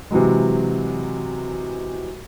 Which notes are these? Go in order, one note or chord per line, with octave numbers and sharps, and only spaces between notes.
C3 E3 F#3 G#3